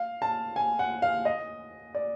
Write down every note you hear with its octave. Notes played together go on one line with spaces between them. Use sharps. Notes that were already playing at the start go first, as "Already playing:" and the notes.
Already playing: F5
A5
G#5
F#5
F5
D#5
D5